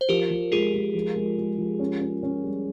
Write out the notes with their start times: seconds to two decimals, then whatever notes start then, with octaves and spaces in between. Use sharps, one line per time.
0.01 C5
0.09 F3 G4 A#4
0.31 F3
0.52 G#3 F4 G#4
0.74 G#3
0.94 F3
1.16 G#3
1.38 G#3
1.58 F3
1.80 C#4
2.01 C#4
2.23 C#4
2.44 G3